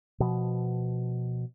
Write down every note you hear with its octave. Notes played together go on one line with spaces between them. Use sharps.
B2 F3